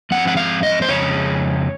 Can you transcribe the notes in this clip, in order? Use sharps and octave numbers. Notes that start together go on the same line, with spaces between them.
G#2 F3 C4 F#5
F#5
F5
D#5
C5
F2 C#3 G#3 C#5